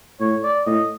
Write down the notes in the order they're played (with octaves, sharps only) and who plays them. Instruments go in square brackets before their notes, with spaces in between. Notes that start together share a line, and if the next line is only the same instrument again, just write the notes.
[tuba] A2 [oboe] C#5
[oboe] D5
[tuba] A2 [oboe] D#5